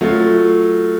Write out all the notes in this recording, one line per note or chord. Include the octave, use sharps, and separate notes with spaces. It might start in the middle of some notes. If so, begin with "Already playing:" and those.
F#3 A3 F4